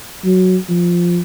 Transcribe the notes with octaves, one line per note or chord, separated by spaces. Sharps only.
F#3
F3